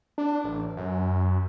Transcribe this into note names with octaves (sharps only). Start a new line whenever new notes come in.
D4
A1
F#2